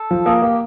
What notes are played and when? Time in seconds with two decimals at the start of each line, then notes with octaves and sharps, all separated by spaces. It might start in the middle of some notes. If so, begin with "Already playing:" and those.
Already playing: A4
0.11 F3
0.26 A#3 G#4
0.42 A#3 G4